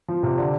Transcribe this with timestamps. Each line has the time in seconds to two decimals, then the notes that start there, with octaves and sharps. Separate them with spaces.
0.08 F3
0.23 C3
0.38 D3